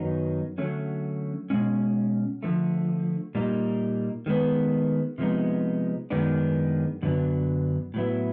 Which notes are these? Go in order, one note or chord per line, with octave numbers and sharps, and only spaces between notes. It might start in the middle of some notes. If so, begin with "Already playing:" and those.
Already playing: F#2 D#3 F#3 B3 D#4
D3 F#3 A3 C#4
B2 G#3 C#4
D3 F3 A3
A#2 G3 A#3 D#4
D#3 G#3 B3
C3 F3 G#3 B3 D#4
F#2 D#3 G#3 B3 D4
F#2 D3 F#3 B3 D4
A2 F#3 B3 E4